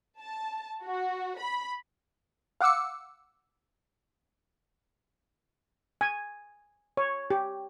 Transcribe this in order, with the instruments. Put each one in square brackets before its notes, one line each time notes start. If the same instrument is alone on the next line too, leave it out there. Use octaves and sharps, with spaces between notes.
[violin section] A5
F#4
B5
[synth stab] F5 F#5 D6 E6 C#7
[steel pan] G#5
C#5
G4